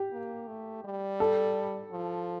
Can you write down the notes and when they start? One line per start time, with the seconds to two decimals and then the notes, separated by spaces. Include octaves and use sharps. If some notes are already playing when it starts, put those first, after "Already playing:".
Already playing: G4
0.12 A#3
0.47 A3
0.84 G3
1.20 A4
1.91 F3